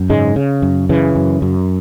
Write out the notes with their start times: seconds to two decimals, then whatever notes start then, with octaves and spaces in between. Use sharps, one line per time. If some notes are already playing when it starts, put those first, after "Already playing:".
Already playing: F#2
0.10 G#2 C#3 G#3
0.36 C#3
0.62 F#2
0.89 C#3 E3
1.15 F#2
1.42 F#2